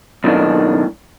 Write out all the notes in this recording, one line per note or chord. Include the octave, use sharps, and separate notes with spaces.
B1 A2 D#3 D4